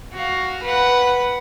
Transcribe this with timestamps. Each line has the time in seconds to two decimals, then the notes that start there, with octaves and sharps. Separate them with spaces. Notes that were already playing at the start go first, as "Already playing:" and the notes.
0.13 F#4 F5
0.63 B4 F#5